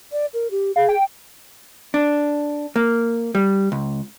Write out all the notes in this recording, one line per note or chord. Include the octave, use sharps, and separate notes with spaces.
D5
A#4
G4
G#4 F5
G5
D4
A#3
G3
C#2